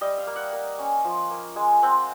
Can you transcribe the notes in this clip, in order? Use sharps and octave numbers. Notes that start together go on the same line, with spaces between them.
G3 D#5
F5
A#3
F#5
A#3
C#4
F3
A#3
G#3 G#5
C4 F#5